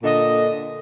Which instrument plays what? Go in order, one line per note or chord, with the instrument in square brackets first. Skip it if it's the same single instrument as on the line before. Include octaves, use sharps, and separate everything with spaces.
[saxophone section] A#2 D3 D#5